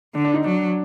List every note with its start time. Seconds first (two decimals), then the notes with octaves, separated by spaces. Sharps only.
0.14 D3 D4
0.25 D4
0.34 D#4
0.44 F#3 D4